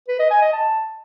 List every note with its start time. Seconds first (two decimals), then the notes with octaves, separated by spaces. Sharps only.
0.08 B4
0.19 D#5
0.30 G#5
0.41 D#5
0.52 A5